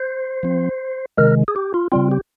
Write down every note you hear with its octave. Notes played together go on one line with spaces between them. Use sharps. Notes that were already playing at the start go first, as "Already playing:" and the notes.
Already playing: C5
F3 C4
C3 D#3 G#3 A#4
G#4
G4
F4
C#3 G3 C4 F4
G4